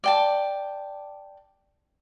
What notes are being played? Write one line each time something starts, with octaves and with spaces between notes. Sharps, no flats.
D5 G5 A5